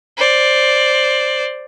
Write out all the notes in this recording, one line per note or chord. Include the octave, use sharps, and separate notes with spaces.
C5 D5